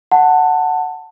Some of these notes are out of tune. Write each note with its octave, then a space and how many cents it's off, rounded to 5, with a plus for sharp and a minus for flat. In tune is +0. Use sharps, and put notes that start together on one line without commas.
F#5 +0 A5 +15